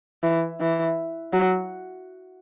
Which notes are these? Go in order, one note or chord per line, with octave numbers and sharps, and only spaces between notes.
E3
E3
F#3